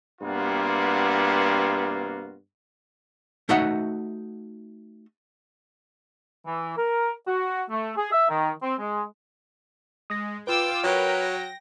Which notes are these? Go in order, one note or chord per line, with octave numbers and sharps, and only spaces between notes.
G2 C3 A#3 B3 F4 F#4
A3 D#4 F#4 D#5 E5 F#5
E3
A#4
F#4
A3
G#4
E5
D#3
C4
G#3
G#3 D#6 A#6
F4 B4 G5 D6 E6
F#3 A#4 B4 C#5 G5 A#5
A#6